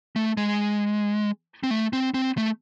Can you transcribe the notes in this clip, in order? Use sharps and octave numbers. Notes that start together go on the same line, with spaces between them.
A3
G#3
C4
A3
C4
C4
A3